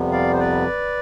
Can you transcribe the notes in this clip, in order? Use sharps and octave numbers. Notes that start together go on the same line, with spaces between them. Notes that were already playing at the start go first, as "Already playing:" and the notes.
Already playing: F2 C3 G3 B3
D5 F5
C5
B4 D5